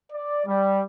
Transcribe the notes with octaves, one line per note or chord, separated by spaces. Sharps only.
D5
G3